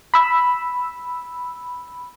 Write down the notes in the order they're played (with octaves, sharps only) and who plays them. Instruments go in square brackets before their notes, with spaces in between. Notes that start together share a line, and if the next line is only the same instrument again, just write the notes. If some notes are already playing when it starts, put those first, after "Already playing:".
[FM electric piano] B5 E6